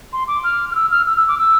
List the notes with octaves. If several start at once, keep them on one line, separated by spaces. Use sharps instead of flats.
C6
D6
F6
F6
E6
F6
E6
E6
D6
E6